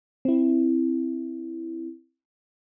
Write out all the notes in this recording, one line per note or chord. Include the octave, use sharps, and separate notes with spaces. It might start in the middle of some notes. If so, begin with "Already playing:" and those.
C4 E4